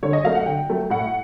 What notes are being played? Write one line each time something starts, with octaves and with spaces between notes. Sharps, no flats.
D3 C#5
D#5
F#3 A3 F5
F#5
D3 G5
F#3 A3
A2 F#5